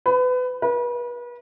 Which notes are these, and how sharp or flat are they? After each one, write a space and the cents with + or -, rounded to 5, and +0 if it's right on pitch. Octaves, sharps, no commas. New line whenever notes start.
B4 +30
B4 -35